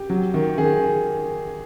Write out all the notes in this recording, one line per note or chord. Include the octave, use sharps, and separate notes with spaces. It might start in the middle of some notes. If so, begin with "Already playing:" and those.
Already playing: G4
F#3
D#3
D#3 G#4